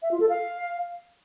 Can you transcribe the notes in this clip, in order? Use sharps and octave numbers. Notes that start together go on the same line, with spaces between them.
E5
F4
A4
F5